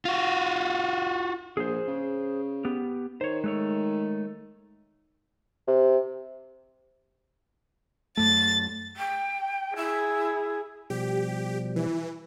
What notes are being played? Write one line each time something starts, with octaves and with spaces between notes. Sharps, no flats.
F4 F#4
A#1 G#4 C5
C#3
B3 G4
D#3 C5 C#5
G#3 A3 C#5
C3
F#2 A3 A6
G5
E4 G#4
B2 F3 G3 G4
E3